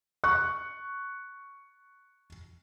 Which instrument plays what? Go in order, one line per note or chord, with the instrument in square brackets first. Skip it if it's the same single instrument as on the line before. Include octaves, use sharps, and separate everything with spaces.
[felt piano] C#6 F#6